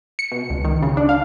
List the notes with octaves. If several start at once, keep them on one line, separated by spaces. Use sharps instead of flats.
C#7
B2
C#2
D#3
C#3
D4
F5